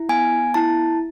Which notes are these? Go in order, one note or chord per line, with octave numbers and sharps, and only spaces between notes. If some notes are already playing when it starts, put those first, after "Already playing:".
Already playing: E4
B3 G#5
E4 A5